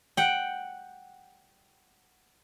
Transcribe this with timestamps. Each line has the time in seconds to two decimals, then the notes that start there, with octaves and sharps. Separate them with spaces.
0.17 F#5 G5